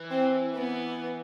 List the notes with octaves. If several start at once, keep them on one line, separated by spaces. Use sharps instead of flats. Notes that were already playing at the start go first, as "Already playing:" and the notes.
Already playing: E3
C4
B3